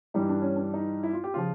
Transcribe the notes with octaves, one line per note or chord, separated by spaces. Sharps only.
G2 E3 G3 D#4
D4
C#4
D4
D#4
E4
F4
G4
C#3 F3 F4